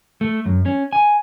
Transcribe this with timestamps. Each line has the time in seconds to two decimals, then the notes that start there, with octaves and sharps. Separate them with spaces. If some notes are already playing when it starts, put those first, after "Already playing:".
0.21 A3
0.46 F#2
0.66 C#4
0.93 G#5